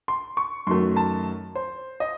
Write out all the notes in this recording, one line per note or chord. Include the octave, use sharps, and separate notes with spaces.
C6
C#6
F#2 D#3 F#3 A3 C6
A5
C5
D#5